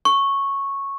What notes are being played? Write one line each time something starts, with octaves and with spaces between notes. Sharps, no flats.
C#6